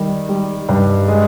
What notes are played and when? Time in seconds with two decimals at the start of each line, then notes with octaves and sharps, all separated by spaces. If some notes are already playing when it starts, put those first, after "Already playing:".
Already playing: D#3 G3
0.29 G3
0.69 G2
1.08 G#3